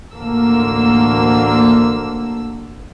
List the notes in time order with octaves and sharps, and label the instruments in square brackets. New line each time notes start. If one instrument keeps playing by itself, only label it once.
[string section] A1 D2 D3 A#3 E6